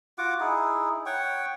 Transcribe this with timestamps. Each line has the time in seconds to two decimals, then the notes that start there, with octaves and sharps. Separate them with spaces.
0.18 F4 F#4 F#5 D6
0.40 D#4 E4 G#4
1.06 C#5 F#5 G5 C#6